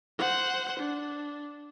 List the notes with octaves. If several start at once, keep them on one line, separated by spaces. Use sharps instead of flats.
C5 F#5
D4